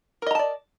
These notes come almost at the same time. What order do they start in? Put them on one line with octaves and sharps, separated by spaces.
A#4 D#5 A#5 A5 D5